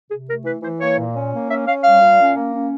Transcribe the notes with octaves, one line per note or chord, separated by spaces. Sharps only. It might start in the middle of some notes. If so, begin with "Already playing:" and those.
C3 G#4
A3 A#4
E3 B4
E3 C5
A#3 C#5
A#2
C#4
A#3
C#4 E5
C#4 F5
G3 F5
A#2
C#4
A#3
C#4